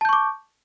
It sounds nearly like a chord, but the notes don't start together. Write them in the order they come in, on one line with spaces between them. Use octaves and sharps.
A5 G6 C#6 D6